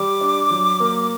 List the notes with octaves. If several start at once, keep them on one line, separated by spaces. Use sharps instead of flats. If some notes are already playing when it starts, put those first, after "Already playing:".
Already playing: G3 D6
D4
F#3
A#3